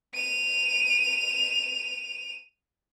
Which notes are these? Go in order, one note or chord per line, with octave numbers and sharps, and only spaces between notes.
D#7 F7